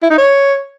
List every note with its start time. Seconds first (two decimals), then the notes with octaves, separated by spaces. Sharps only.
0.03 E4
0.10 D#4
0.18 C#5